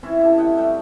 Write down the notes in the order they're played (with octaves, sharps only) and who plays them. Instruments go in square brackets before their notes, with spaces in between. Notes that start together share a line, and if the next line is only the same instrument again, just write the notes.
[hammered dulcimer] E3 C4 C#4 E4
E4 G4 A4
A2 D#5 F#5 G5
G3 A3 G5